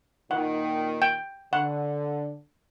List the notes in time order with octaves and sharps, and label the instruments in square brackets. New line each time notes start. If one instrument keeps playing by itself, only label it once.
[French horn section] A#2 D#3 [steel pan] F#5
[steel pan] G5
[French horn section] D3 [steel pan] F#5